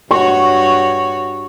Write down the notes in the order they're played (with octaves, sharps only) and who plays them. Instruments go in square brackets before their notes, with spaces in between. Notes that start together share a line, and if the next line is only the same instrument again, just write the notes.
[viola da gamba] G2 F#4 C#5 [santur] C#6